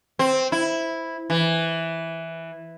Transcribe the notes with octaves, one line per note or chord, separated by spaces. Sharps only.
C4
E4
E3